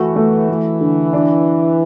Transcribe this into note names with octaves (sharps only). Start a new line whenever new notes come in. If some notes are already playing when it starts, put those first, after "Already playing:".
Already playing: E3 A3 F#4
A3
A3
D3
D4